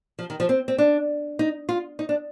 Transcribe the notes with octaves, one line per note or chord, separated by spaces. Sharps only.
F3
D#3
F3
C4
C4
D4
D#4
F4
D#4
D4